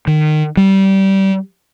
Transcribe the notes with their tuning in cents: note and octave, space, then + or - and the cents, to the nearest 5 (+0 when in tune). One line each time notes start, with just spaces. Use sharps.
D#3 -25
G3 -20